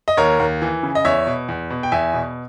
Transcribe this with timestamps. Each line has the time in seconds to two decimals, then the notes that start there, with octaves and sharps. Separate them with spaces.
0.08 D#5
0.17 D#2 A#4 C#5
0.40 D#2
0.62 E3
0.83 C#3
0.95 D#5
1.05 E2 C#5 E5
1.27 B2
1.49 E2
1.70 B2
1.83 G5
1.92 E2 E5 G#5
2.14 B2